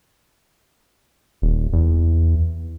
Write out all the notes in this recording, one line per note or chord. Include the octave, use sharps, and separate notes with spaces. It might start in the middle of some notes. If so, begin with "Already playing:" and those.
D#1
E2